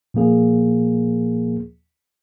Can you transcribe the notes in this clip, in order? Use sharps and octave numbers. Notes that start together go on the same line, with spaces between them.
A#2 F3 A#3 G#4